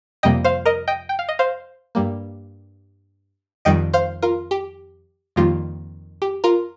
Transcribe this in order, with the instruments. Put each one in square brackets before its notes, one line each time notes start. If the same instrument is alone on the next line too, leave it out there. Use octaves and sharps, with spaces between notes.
[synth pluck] F2 C3 G3 A#3 D#5 G5
C5 F5
A#4 D#5
D#5 G5
G5
F5
D#5
C5 F5
G2 G3 A#3
F2 D#3 G3 D#5 G5
C5 F5
F4 A#4
G4
F2 D#3 G3 A#3 F4
G4
F4 A#4